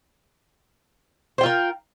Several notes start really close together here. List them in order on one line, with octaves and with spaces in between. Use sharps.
C5 G5 F4 A#4